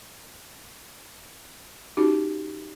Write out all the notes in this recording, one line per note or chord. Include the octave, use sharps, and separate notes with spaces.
C#4 D#4 F#4 G4